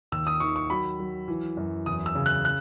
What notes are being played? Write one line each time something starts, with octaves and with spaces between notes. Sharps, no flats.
D#2 E6
D#6
D#3 C#6
C#6
F#3 B5
F#3
E3
F#2
E2 D#6
E6
C#3
F#6
F#6